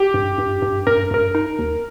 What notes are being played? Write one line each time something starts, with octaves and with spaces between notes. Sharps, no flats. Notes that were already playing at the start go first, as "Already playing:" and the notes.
Already playing: G4
G2
G2
G2
G2 A#4
G2 A#4
D#4
D#2